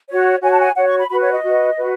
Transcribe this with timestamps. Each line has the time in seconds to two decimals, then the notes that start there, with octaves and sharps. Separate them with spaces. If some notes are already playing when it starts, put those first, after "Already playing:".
0.09 F#4 C#5
0.43 F#4 C#5 G#5
0.52 A5
0.60 G#5
0.76 F#4 C#5 F#5
0.87 C#6
0.98 B5
1.10 F#4 B4 B5
1.21 C#5
1.32 D#5
1.43 F#4 B4
1.77 F#4 B4